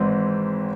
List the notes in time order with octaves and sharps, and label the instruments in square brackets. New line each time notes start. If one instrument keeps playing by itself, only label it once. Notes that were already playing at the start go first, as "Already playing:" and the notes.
Already playing: [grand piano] G#1 G#2 E3 G#3 C4